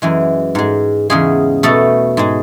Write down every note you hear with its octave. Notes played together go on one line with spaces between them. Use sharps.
F#2 E3 G#3
G#2 G#3
E2 C#3 G#3 G#4
B2 A3 A4
G#2 G#3